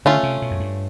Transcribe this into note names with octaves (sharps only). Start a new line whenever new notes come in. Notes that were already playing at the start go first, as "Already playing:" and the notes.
D3 A3 C#4 F4
C3
B2
F#2
G2